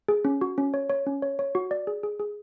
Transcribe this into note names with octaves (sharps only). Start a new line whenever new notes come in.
G#4
C#4
F#4
C#4
C#5
C#5
C#4
C#5
C#5
F#4
D5
G#4
G#4
G#4